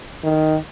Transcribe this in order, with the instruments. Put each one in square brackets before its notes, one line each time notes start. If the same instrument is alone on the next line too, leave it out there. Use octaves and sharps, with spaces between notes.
[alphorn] D#3